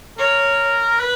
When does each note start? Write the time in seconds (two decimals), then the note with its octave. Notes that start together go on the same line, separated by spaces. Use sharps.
0.18 A#4 C#5
1.00 B4